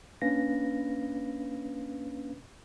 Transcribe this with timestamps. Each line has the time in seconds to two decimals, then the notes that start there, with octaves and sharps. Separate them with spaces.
0.22 A#3 C#4 D4 B4 F5 A#6